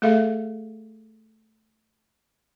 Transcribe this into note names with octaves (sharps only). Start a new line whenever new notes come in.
A3 G#4 A4 E5 F5